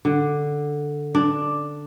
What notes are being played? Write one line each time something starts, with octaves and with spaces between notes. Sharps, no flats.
D3
D4